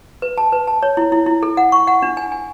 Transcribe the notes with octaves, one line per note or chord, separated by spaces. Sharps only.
B4
A5
B4
A5
C#5
E4
E4
E4
A4
F#5
C#6
F#5
D4
G#5
G#5